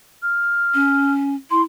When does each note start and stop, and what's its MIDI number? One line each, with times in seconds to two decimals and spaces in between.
0.23 1.13 89
0.74 1.35 61
1.51 1.63 64
1.51 1.62 84